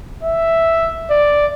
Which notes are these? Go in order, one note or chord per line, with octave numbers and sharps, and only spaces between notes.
E5
D5